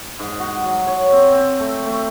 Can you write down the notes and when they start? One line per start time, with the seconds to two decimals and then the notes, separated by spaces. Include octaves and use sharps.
0.19 G#2
0.40 F#4
0.65 F#3
0.87 C#5
1.13 C4
1.33 C4
1.60 A3
1.86 A3